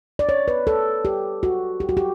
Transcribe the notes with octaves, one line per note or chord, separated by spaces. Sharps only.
D5
C#5
B4
A4
G4
F#4
G4
F#4
G4